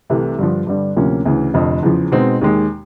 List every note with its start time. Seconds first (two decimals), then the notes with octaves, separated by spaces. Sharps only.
0.10 C2 C3 E3 A3
0.39 G2 D3 F3
0.67 G2 D3 G3
0.96 D2 C3 F3 A#3 C#4
1.25 D2 C#3 E3
1.54 F1 F2 D3 F3
1.83 E2 C#3 F3
2.12 B2 G#3 C4 D#4
2.41 D#2 D#3 G#3